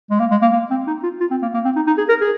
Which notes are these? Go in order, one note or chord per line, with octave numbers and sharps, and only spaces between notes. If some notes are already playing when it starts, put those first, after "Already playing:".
G#3
A#3
G#3
A#3
A#3
C4
D#4
F4
F4
C4
A#3
A#3
C4
D#4
D#4
G#4
A#4
G#4